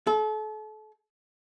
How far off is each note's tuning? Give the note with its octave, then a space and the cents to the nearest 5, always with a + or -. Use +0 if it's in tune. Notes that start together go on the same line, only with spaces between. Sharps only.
A4 -35